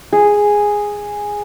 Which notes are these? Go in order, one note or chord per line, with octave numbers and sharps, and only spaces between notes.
G#4